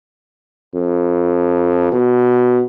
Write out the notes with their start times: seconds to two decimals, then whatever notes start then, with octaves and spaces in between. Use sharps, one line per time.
0.75 F2
1.92 B2